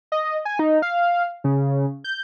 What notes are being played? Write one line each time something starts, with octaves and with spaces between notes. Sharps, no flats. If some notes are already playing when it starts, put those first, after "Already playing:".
D#5
G#5
D#4
F5
C#3
G6